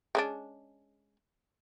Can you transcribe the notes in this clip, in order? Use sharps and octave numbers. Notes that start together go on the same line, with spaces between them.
G#3 C#4 D4